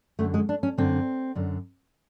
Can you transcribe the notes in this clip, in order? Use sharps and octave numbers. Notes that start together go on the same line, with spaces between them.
F#2 D3 A3
G#3
D4
C#4
F#2 D3 C4
F#2 D3